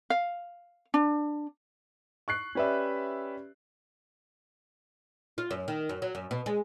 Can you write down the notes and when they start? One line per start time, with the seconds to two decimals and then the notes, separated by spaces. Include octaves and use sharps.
0.10 F5
0.94 D4
2.28 C#6 F#6 C7
2.55 C#4 G4 B4 D5 E5
5.38 F4
5.51 F#2
5.68 D#3
5.89 F#2
6.02 F#3
6.15 F#2
6.31 B2
6.46 G#3